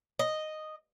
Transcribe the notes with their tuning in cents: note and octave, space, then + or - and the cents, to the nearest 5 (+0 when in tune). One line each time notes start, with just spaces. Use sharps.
D#5 -5